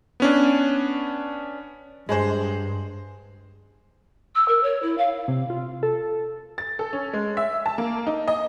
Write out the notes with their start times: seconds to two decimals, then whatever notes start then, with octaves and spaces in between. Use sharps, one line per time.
0.20 B3 C#4 D4
2.09 G2 G#3 G#4 C5
4.35 E6
4.48 A#4
4.63 C#5
4.82 E4
4.98 F5
5.28 C3
5.50 F4
5.83 A4
6.58 A6
6.79 A4
6.93 C#4
7.13 G#3
7.37 E5
7.66 A5
7.78 A#3
8.07 D#4
8.28 D#5